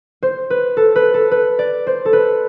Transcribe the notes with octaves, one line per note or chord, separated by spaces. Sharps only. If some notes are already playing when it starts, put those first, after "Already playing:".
C5
B4
A4
B4
A4
B4
D5
C5
A4
B4